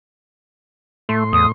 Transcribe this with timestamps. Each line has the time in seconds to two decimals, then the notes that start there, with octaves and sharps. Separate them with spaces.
1.09 A2 A3 C6
1.33 E2 D#6